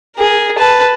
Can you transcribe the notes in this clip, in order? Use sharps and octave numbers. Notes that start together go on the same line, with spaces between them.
G#4 A#4
B4 A5